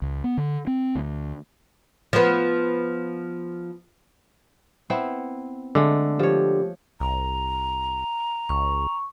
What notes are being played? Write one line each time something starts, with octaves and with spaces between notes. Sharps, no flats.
C#2
B3
D3
C4
D2
F3 B3
B3 C4 E4
D3 G#3 A3
F3 G4 C#5
C2 A#5
C#2 C#6